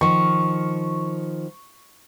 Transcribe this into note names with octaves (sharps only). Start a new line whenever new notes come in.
D#3 F3 C#6